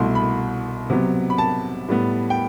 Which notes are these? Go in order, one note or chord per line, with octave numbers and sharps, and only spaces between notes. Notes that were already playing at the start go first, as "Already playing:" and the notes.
Already playing: C2 B2 A3 E4 C6
B5
C3 F#3 B3
B5
A5
A2 G3 B3
G5